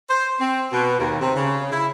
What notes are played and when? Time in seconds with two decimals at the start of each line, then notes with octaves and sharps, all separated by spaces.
0.09 C5
0.40 C4
0.72 B2
0.99 D#2
1.21 C3
1.36 C#3
1.72 E4